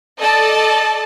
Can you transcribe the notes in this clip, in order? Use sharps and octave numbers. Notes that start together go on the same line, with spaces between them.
A4 D5 D#5 A5